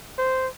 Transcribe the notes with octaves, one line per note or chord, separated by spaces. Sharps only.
C5